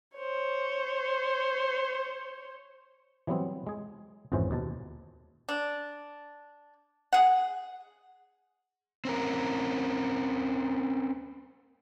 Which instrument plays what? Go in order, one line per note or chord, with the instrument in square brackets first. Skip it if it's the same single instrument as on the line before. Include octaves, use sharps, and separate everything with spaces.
[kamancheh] C5 C#5
[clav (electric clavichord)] E3 F#3 G3 B3 C4
G#3 G#4
G#1 F2 G#2 E3 C#4 C5
D#2 B2 A5
[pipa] D4
G#4 F#5
[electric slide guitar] C4 C#4 A#4